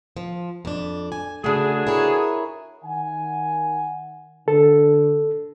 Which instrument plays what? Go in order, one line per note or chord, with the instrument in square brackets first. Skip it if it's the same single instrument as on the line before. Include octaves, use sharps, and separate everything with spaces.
[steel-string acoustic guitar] F3
F2 D4
G#5
[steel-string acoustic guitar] C#3 A3 [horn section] D4 F#4 G#4
[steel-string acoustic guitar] E4 A#4 C#5
[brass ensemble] D#3 F#5 G#5
[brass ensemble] D3 [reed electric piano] A4